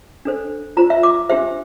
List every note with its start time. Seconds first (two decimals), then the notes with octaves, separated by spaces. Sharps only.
0.25 D4 A4 C5
0.77 F4 C5 A#5
0.90 E5
1.03 D6
1.29 D4 G4 C5 E5